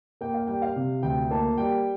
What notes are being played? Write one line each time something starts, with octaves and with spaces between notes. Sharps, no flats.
A#3 G5
F5
G3 G5
F5
C3
D2 G5
A#3 A5
G3 G5